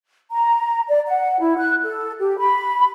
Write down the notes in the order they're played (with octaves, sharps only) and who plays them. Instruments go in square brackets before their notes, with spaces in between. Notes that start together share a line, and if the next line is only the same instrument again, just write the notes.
[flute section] A#5
D5
F#5
E4
F#6
A4
G4
B5